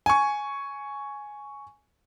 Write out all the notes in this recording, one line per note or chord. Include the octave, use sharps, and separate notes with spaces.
G#5 C#6